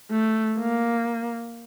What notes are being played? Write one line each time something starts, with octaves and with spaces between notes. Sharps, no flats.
A3
A#3